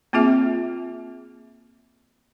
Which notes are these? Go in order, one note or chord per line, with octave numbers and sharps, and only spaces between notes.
A#3 C4 F4 G#4 E5